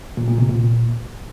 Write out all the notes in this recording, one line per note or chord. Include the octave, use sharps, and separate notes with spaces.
A#2
A#2
C3
A#2